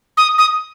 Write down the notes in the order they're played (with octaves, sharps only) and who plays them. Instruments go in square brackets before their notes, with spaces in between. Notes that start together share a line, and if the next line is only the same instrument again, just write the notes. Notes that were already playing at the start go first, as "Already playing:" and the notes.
[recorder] D#6
D#6